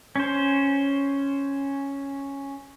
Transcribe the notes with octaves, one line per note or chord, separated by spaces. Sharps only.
C#4 C5